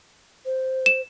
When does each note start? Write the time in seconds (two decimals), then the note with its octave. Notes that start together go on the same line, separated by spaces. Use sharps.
0.45 C5
0.86 E7